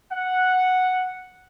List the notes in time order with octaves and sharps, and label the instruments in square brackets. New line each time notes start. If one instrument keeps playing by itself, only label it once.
[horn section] F#5